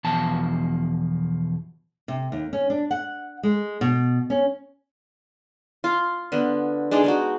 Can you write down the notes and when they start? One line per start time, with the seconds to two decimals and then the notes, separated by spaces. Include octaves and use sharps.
0.04 E2 B2 F3 A5
2.08 C3
2.32 D#2
2.53 C#4
2.70 D4
2.91 F#5
3.43 G#3
3.81 B2
4.30 C#4
5.84 F4
6.32 D3 B3
6.91 G#3 D4 D#4 A4
7.04 G#3 D#4 F#4